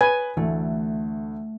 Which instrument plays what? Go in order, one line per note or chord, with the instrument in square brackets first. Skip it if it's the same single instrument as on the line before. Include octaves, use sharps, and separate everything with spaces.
[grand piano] B4 [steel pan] G#5
[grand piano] D2 [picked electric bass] E3 [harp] A3